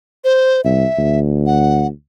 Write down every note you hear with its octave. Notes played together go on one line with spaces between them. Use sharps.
C5
C2 E5
D2
F#5